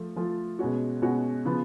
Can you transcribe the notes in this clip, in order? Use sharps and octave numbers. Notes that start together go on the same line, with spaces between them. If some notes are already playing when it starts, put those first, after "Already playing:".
Already playing: F3 A3 F4
F3 A3 F4
B2 G#3 C#4 F#4
B2 G#3 C#4 F#4
C#3 F3 B3